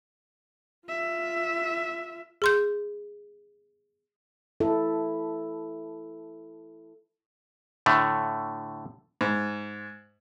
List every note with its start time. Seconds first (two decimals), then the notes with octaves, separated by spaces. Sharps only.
0.88 F4 E5
2.42 G#4 C6 G6
4.60 E4 A4
7.86 A2 D3 A3
9.21 G#2